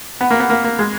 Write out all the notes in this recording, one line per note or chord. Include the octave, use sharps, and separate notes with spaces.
B3
A#3
B3
A#3
A#3
G#3